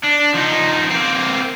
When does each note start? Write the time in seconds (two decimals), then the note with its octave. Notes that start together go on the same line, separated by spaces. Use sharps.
0.03 D4
0.34 F3 D#4
0.91 A#3 C4